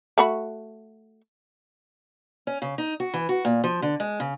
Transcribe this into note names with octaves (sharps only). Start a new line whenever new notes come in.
A3 F#4 B5
C#4
C#3
D#4
F#4
E3
F#4
A#2
F3
D3
G#3
C#3